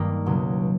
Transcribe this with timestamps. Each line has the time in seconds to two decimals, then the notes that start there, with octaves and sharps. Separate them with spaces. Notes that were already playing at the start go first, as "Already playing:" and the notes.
Already playing: G2 D#3 G3 A#3 D#4
0.26 C#2 B2 F#3